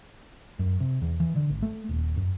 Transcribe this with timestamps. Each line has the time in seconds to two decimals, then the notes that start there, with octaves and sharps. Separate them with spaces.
0.59 F#2
0.80 C3
1.02 E2
1.20 E3
1.36 D3
1.50 G#1
1.62 A3
1.89 D#1
2.17 F#2